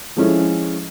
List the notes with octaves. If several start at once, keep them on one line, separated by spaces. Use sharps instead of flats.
F3 G#3 C#4 E4 A4